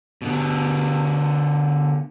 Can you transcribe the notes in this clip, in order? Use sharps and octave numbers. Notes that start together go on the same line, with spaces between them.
B2 D3